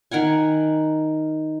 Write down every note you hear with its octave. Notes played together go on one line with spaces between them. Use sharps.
D#3 A#4 F#5 G#5